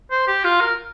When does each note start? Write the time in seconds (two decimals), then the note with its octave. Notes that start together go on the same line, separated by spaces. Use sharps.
0.11 C5
0.27 G4
0.44 F4
0.60 A#4